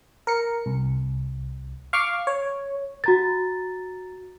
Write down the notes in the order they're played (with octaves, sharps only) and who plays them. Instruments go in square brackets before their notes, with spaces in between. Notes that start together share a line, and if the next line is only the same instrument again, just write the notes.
[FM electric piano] A#4 C#7
C2
F5 C#6 D6 F6
C#5
[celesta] F#4 A#5 A6